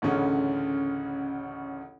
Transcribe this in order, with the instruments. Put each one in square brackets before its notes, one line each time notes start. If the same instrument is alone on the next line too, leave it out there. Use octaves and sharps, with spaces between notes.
[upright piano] A1 D2 C#3 C#4